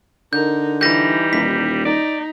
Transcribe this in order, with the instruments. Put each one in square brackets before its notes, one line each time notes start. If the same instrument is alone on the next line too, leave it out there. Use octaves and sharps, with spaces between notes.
[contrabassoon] D3 [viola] D#4 A#4 [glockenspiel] G6
[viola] E3 D#4 [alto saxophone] G3 [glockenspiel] G6 A#6
[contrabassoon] D#1 [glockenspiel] B6
[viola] D#4 [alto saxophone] D5